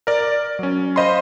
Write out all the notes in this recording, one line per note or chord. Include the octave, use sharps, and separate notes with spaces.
A#4 D5
F#3 C#4
C5 D#5 F5 B5 C6